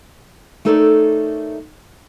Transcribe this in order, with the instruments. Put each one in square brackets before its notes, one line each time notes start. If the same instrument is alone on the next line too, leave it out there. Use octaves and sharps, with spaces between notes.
[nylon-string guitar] A3 D#4 A4 A#4 C#5 D5